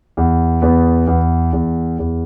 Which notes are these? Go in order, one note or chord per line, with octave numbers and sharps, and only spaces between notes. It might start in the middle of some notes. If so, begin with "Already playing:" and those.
E2
E2 B3
E2
E2
E2